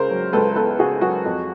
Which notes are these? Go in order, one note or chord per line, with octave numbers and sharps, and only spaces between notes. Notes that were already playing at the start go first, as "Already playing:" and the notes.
Already playing: C#2 C#3 A#4 C5
F#3
C#2 A4 B4
B3 A4 B4
C#3 F#4 G#4
F#3 F#4 G#4
F2